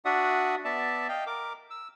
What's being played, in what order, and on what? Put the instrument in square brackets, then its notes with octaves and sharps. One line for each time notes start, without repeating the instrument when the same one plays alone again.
[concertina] D4 F#4 D5 E5 F#5 D#6
B3 D5 E5 A5
D#5 F5 G5
A#4 D6
E6